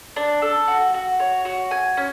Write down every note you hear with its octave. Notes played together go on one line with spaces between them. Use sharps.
D4
A4
F#4
F#4
C#5
F#4
G#5
C#4